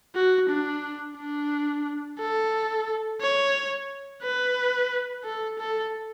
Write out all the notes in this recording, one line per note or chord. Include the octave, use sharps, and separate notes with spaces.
F#4
D4
D4
A4
C#5
B4
A4
A4